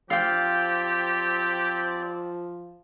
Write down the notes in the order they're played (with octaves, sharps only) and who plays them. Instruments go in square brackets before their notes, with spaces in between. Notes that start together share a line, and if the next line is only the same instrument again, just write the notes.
[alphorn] F3 [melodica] C4 D5 [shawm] G4 [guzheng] F5 G5